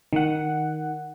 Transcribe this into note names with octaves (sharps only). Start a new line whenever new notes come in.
D#3 F#5